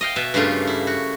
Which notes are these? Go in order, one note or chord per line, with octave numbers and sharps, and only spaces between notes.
D#5 F5 G5
B2 E5 A5
G2 C#3 A3 A#3 F4
E4
F#4